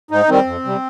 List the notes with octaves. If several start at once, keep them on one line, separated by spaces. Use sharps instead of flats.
G#2 D#4
D#3 G3 C4
F2
C3 G3